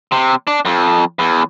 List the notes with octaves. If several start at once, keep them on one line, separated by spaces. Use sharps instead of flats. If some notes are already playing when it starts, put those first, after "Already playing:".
C3
D4
F2
E2